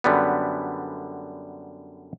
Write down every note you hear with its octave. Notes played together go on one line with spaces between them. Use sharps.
F#2 D3 G3 B3